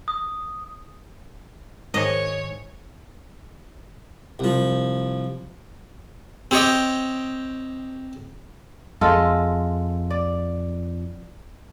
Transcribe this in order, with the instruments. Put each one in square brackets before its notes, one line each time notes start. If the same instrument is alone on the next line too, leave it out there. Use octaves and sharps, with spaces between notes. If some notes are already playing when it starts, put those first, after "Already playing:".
[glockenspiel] D#6
[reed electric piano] G#2 D#3 [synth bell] A#4 C5 G#5 [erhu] C#5 [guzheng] D#5
[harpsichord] C2 F3
C4 G4 C#5 D#5
[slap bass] F2 [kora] G#3 F4 A4
[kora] D5